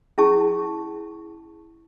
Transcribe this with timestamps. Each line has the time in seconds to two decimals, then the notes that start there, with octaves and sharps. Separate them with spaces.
0.18 C#4 E4 G#4 A5 C#6